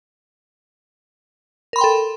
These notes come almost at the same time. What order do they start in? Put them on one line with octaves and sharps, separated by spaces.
A#4 B5 C6 G5 A4